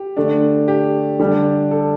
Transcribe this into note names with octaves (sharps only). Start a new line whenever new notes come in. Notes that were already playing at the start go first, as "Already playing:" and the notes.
Already playing: G4
D3 A3 D4
G4
D3 G3 D4
A4